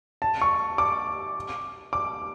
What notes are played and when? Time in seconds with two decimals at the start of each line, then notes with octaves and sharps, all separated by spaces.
0.22 A5
0.42 C#6
0.78 D6
1.93 D6